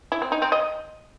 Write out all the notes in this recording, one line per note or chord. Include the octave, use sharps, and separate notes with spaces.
E4
C4
D#4
C4
D#5